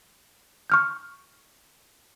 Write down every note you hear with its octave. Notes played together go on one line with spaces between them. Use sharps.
C#6 F6 G6